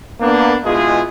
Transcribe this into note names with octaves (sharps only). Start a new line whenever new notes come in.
A#3 B3 D4
B2 G#3 E4 F4 G#4